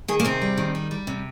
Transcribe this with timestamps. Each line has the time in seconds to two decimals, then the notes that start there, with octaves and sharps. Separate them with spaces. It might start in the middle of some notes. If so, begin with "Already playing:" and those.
0.08 D#3 G#4
0.20 A#3
0.25 C3 C4
0.42 G3
0.58 D#3
0.75 G3
0.91 G3
1.07 C3